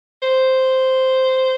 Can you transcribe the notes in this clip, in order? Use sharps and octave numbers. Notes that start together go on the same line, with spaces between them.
C5